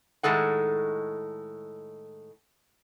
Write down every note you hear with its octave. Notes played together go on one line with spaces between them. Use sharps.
A2 D#3 G#3 A4 F#5